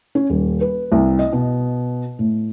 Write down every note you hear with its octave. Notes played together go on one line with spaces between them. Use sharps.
C#4
D#1
B4
C2
D#5
B2
A2